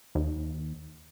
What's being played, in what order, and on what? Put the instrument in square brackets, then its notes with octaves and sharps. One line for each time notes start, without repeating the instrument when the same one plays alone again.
[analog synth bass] D#2